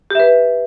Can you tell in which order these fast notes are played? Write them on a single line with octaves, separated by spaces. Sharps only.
G4 E5 B4